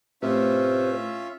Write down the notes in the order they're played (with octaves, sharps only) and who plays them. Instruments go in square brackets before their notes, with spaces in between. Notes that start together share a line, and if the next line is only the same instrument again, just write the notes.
[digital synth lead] A2 [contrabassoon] C3 [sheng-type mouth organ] C#4 F4 E5 [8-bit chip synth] B4 C5